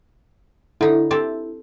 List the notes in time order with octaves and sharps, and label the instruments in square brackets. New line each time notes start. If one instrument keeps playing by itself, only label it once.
[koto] D3 D#4 [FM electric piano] E4
[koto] C4 G4 A4